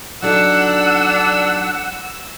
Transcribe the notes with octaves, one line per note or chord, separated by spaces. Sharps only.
F#3 D4 D#4 A4 F#5 E6